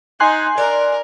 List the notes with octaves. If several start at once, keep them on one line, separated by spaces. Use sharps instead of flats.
D#4 G#5 C6 F#6
A#4 D5